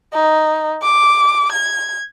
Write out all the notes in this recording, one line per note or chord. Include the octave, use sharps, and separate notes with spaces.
D#4
D6
G#6